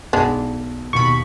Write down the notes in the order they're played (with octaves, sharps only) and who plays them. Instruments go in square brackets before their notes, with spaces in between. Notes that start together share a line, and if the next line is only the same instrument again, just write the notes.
[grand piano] B1 [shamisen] G#3 B3 D4
[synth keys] D#2 B2 B5 [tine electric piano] C#6